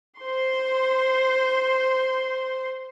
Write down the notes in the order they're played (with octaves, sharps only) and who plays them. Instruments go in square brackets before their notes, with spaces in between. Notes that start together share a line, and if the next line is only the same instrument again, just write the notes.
[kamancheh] C5 C6